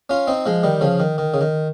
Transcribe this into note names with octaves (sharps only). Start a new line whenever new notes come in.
C#4 F4
C4 D#4
F3 G#3
D#3 G3
C#3 F3
D#3
D#3
C#3
D#3